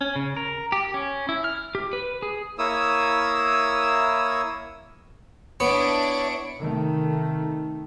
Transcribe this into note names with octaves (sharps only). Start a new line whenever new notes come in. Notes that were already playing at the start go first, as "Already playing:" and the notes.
C#4
C#3
A#4
G4
C#4
E4
F6
G4
B4
G#4
A#3 E4 C#5 D#6 E6
B3 D4 E4 C#5 D7
C3 D#3 A3